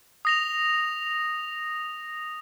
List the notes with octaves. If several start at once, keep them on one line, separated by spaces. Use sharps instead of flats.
D#6 A#6 F7